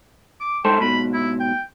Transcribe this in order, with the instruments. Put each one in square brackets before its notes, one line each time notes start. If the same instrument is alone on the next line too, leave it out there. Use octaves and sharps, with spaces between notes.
[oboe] D6
[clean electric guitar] G#2 A4 C5 [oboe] G5
[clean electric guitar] G#2 B2 [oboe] B5
[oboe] E4
G5